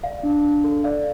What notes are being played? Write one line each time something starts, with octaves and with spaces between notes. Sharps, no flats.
D5 F5
D4
D4
A4
D5 F5